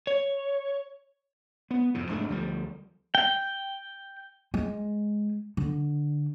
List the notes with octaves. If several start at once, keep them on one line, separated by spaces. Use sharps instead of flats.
C#5
B3
F2 G#2 C3
F1 G#2 A3 D4
D2 F3 G3
G5
G#3
D3